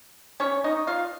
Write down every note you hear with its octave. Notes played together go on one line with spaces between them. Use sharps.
C#4 C#5
D#4 D#5
F4 F5